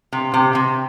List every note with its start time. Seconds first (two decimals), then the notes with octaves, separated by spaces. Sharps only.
0.12 C3
0.34 C3
0.55 C3